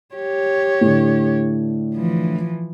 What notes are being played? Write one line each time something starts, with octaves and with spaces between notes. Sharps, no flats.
G4 C#5
A2 D3
E3 F3